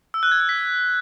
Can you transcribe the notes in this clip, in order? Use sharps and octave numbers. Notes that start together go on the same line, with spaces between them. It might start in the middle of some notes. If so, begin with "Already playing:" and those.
E6
F#6
G#6
E6
B6